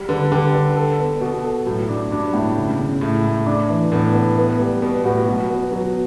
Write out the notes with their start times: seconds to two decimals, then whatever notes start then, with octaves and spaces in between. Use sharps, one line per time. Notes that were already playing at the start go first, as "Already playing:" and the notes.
Already playing: G3
0.09 D3 B4
0.31 D3 G4
0.55 B4
0.77 A4
0.99 B3
1.21 B2 F#4
1.44 A4
1.66 A2 F#3
1.89 D4
2.11 G2 D4
2.34 A2
2.56 C#3
2.79 C#3
3.01 A2 E4
3.24 A3
3.46 D4
3.69 E3
3.92 A2 B3
4.14 B3
4.37 B3
4.59 G3
4.82 B2 B4
5.04 A2 F#4
5.27 B2 F#3
5.50 B3
5.72 F#3